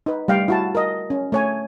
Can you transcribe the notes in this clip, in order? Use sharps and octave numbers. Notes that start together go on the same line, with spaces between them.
D#4 B4
G3 A3 F5 G5
E4 F#4 A5
A#4 D#5
C#4
A3 C#5 G#5